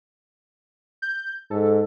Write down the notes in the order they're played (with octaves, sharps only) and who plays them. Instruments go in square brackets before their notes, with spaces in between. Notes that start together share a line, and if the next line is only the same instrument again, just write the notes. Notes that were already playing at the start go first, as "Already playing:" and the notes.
[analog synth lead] G6
[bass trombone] G#2 [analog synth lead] A4